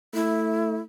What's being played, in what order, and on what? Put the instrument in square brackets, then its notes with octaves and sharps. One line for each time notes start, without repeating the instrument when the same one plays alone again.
[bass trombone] A3 [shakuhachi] E4